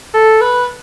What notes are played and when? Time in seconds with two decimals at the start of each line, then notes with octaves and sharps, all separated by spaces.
0.14 A4
0.41 B4